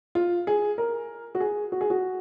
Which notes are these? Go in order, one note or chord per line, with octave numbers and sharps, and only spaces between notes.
F4
G#4
A#4
F#4
G#4
F#4
G#4
F#4